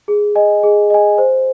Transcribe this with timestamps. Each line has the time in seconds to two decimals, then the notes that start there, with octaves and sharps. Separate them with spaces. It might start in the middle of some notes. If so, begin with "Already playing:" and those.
0.08 G#4
0.35 D#5 G#5
0.63 G#4
0.90 D#5 G#5
1.18 C5